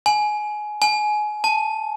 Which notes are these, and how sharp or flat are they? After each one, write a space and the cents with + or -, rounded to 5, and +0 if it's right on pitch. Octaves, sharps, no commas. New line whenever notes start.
G#5 +20
G#5 +25
A5 +0